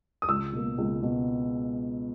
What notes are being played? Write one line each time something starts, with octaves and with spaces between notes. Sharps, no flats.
D#6
C#2 E6
B2 A#3
C#2
B2